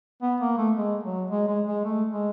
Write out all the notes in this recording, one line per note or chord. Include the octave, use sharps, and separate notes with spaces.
B3
A#3
A3
G#3
F#3
G#3
G#3
G#3
A3
G#3